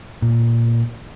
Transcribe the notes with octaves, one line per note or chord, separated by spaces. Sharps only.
A#2